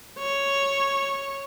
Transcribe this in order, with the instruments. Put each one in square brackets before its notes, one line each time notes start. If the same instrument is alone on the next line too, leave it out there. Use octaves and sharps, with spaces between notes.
[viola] C#5